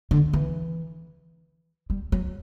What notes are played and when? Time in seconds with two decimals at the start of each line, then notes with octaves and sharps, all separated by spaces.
0.11 D3
0.33 E3
1.90 G3
2.12 F#3